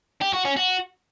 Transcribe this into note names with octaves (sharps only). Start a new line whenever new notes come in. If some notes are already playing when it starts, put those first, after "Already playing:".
G4
F#4
C#4
F#4